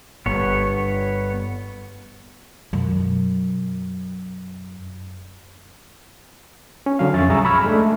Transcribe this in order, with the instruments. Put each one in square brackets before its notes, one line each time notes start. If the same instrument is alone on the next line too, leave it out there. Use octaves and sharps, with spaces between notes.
[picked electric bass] G1 [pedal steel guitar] B3 C#5
[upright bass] F#2 B2
[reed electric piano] C#4
D3 F#3 F5
F2 C#4 C#5 E5 A6
C2 G2 G#4 A#5 C#6 E6
B5 C#6 E6 F6 G#6
G#3 A3 D4